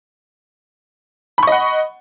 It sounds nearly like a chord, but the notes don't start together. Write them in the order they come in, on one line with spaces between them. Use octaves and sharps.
B5 C#6 D#5 F#5